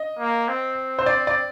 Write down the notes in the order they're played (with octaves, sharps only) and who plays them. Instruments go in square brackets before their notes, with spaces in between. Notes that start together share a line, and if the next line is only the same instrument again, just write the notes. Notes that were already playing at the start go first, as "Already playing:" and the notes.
Already playing: [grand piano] D#5
[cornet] A#3
C4
[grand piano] C5
D5
D5